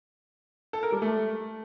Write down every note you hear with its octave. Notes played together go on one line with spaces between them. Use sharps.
A4
A#4
G3
A3